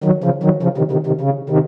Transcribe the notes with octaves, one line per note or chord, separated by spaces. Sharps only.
D#3 F#3
C#3 F3
D#3 F#3
C#3 F3
C3 D#3
C3 D#3
C3 D#3
C#3
C3 D#3